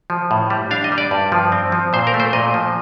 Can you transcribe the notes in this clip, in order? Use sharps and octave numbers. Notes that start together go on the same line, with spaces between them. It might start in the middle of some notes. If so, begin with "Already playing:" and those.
F3
A2
G3
D4 F5
D#5
G3
D5
G2
F3
C4
F3
A#2 C5
A#4
A3
C5
A#2 D#5
F3